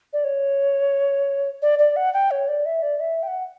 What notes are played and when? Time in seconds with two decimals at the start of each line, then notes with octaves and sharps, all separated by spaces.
0.13 D5
0.24 C#5
1.62 D5
1.79 D5
1.96 F#5
2.14 G5
2.31 C#5
2.48 D5
2.65 E5
2.82 D5
3.00 E5
3.23 G5
3.27 F#5